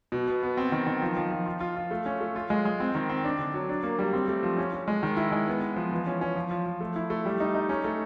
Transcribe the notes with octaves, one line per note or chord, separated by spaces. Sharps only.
B2
B3
B3
C4
D#3
D#3
F3
F3
F3
F4
F4
F4
A3
C#4
A3
F4
G#3
G#3
C4
D#3
C4
D4
D3
F#3
D4
A#3
G3
C4
A3
F3
C#4
C#4
G#3
D#3
E4
G#3
B3
B3
F3
E3
C#4
C#4
F3
F3
F3
A3
E4
A3
G3
D#4
D#4
C#4
A3